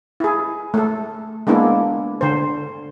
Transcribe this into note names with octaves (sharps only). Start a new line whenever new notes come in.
E4 G#4
A3 A4
G#3 A#3 B3 D4 E4
D3 C5